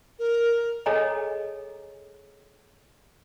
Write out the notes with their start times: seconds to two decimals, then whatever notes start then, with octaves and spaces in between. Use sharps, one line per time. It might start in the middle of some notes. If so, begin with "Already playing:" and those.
0.19 A#4
0.86 G#4 A4 C#5 D#5 G#5 A#5